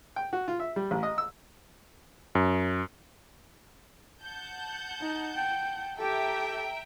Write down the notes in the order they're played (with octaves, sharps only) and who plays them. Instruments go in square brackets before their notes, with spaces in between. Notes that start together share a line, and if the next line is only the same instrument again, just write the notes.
[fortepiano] G5
F#4
F4
E5
G3
A1
D#5
E6
[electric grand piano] F#2
[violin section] F#5 A5 G6
[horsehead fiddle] D#4
G5
[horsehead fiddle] G4 A4 [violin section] E5 G5 A#5